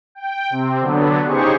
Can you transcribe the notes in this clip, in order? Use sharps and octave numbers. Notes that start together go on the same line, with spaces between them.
G5
C3 C4
D3 F#3 B3 D4
C#3 D#4 G4 G#4 C5 C#6